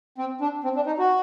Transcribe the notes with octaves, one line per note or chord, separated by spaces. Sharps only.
C4
D4
C4
D4
D#4
F#4